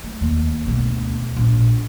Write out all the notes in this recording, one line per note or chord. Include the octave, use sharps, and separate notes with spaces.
A3
D#2
D2 B2
A#1